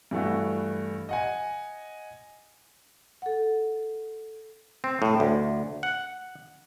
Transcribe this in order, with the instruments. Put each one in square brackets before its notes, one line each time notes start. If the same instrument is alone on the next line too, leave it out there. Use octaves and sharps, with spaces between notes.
[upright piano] G2 E3 A3 F#4
D#5 F#5 G#5
[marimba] A4 F#5
[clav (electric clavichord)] C4
A2
D2
F#5